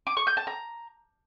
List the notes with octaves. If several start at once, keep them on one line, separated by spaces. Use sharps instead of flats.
D6
C#6
G6
A5
A#5